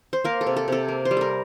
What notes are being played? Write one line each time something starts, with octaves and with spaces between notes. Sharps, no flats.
C5
A#3 A#4
A4
C3
A4
C3 A4
A#3
C5
G3
A4 A#4